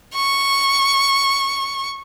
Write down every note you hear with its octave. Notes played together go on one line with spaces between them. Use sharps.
C#6